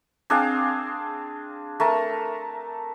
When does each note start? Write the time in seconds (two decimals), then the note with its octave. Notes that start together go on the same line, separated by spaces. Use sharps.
0.30 C4 D4 G#4 F5
1.80 A3 A#4 A5